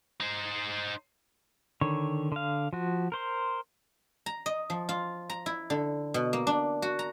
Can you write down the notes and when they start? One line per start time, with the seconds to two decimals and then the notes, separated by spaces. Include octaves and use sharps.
0.20 D#4 C5
1.81 D3 D#3 C#5
2.32 D3 F5
2.73 F3 F#4
3.12 A#4 C5 C6
4.26 A#5
4.46 D#5
4.70 F3
4.89 F4
5.30 A#5
5.46 E4
5.70 D3
6.14 B2
6.33 A#3
6.47 D4
6.82 F#4
6.99 A#5